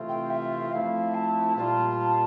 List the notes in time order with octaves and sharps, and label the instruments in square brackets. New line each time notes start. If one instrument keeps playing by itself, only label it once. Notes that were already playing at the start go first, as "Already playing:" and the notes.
Already playing: [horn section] C3 E3 A3 C4 F4
[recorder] G5
E5
[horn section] F3 A3 C4 E4 [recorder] F5
[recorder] A5
[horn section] A#2 G3 A#3 F4 [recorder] A5
[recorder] A5